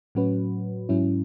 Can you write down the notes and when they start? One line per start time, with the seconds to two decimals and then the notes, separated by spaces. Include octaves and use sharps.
0.15 A2 F#3 C#4 F#4 B4
0.89 G#2 F#3 C#4 E4